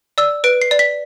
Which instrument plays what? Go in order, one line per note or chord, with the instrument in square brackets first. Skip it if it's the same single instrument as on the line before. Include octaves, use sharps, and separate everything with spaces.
[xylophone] D5 E6
B4 D7
C7
D5
B6